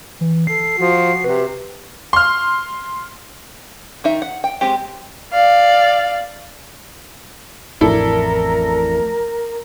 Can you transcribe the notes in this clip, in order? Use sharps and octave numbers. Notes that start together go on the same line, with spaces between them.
E3
A4 C7
F3 F#4
C3 B4
C6 F6
D#3 D#4 E5
F#5
G5
G#3 C4 G4
D5 F5
A1 F2 A2 D4 E4 A4 A#4